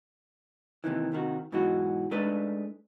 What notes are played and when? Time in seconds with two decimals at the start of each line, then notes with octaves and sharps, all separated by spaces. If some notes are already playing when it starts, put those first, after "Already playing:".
0.84 D#2 A2 C3 D#3 E3
1.12 D#2 C3 D#3 F#4
1.52 G#2 B2 E3 F#3 D#4 F#4
2.11 G#3 A3 D4 D#4 B4 D5